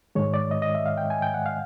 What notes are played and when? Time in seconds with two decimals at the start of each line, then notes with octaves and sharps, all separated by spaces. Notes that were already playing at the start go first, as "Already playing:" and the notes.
0.15 G#2 D#3 G#3 C#5
0.34 D5
0.51 D#5
0.62 D#5
0.75 E5
0.86 F5
0.98 G5
1.10 G#5
1.22 G5
1.34 F#5
1.46 F5